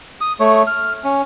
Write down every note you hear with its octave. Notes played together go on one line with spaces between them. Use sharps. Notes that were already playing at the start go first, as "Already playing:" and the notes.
D#6
A3 C#5
F6
C#4